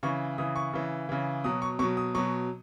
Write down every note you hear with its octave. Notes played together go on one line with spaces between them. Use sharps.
C#3 E3 C#6
C#3 E3 D#6
C#6
C#3 E3
C#3 E3
B2 F#3 D#6
C#6
B2 F#3 C#6
D#6
B2 F#3 C#6